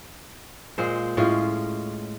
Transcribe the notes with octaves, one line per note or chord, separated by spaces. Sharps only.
A#2 G#3 C5
A2 G#3 C#4 F4